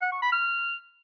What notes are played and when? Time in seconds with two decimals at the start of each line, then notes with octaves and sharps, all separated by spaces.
0.02 F#5
0.12 C#6
0.22 B5
0.32 F6